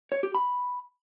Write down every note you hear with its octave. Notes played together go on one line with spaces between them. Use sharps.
C#5
G4
B5